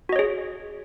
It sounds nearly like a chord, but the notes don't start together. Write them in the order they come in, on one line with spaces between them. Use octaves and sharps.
F#4 D#5 C#5 G#4